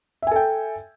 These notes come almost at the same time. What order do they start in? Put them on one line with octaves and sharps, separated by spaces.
E5 G#5 A4 G5